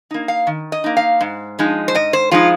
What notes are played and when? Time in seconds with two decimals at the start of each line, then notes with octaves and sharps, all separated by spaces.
0.11 A#3 D#4
0.28 F5
0.47 D#3
0.72 D#5
0.84 A#3 D#4
0.97 F5
1.21 G#2
1.59 F3 G#3 D#4
1.88 C5
1.95 G#2 D#5
2.13 C5
2.31 F3 G#3 D#4 F4